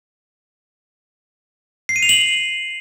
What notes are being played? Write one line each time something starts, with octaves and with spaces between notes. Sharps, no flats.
C7
D#7
F7
F#7